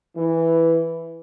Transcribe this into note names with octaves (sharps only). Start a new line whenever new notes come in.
E3